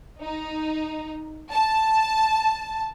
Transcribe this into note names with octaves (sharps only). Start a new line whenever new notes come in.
D#4
A5